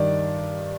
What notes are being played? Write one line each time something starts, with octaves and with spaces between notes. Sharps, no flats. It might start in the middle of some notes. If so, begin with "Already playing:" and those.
Already playing: G2 D#3 D5